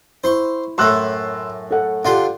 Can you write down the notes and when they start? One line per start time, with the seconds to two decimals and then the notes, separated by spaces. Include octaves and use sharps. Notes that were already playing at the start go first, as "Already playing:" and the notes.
0.24 E4 C5 C6 C#6
0.78 F#2 A2 A3 C6 E6 F#6
1.71 A4 F#5
2.05 D3 F4 G4 F#5 C6